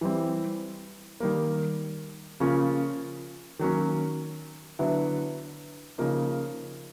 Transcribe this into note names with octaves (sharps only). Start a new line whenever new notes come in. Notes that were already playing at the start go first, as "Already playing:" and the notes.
E3 G3 C4
D#3 G3 A#3
C#3 F3 A#3 C#4 F4
D#3 F#3 A#3 C#4
D3 F#3 B3 E4
C#3 F3 A#3 D#4